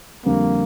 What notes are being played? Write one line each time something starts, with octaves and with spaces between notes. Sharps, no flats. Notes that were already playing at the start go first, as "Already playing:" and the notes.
F2 D3 G3 A#3 C4